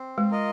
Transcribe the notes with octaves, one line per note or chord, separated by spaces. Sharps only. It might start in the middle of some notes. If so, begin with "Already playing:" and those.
Already playing: C4
G#3
F4 A#4 D#5